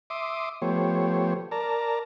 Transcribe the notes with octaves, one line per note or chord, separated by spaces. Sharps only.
E5 C6 D6 D#6
F3 A3 B3 G4 C5 C#5
A#4 D5 A5 A#5